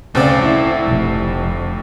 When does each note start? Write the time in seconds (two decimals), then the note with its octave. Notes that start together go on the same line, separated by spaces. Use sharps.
0.15 D2 C#3 C4 D5
0.45 E4
0.85 F1